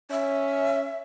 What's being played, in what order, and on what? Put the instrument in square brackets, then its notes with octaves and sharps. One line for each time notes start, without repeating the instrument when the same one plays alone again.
[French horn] C#4 [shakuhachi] E5